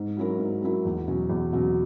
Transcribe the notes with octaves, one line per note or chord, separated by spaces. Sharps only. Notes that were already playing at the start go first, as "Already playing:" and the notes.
Already playing: G#2
F#3 C#4 E4 A#4
G#2
F#3 C#4 E4 A#4
E2
B2 F#3 C#4
E2
B2 F#3 C#4